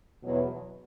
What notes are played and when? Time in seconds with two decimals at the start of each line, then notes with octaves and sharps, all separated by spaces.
0.22 E2 B2 F#3